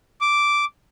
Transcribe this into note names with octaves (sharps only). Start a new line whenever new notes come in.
D6